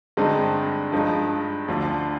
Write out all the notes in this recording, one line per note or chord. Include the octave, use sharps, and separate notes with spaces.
G2 D3 G#3 C4 D#4
G2 F3 G#3 D#4
D2 D3 F3